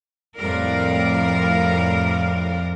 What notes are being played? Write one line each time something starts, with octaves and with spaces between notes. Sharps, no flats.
F2 A2 G3 A#4 D5 F5